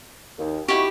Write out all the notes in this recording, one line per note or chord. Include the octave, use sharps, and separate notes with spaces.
D#2
D#4 E4 F#4 G4 C#6